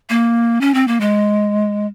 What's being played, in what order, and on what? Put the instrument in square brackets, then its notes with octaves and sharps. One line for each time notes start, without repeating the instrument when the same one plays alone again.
[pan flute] A#3
C#4
C4
A#3
G#3